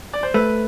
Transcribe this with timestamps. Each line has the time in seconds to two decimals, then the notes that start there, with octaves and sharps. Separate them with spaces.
0.13 D5
0.23 C5
0.34 A3 B4